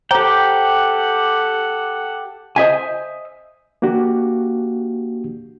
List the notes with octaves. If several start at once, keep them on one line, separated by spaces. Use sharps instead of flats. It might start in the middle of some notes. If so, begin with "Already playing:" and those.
G4 A4 C5 F#5 G5 A#5 D6
C5 D#5 E5 G#5
A#3 D4 F#4 G4